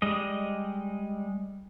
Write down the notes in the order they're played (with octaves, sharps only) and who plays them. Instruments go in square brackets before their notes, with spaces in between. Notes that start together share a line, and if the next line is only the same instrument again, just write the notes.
[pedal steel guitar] G3 G#3 D#5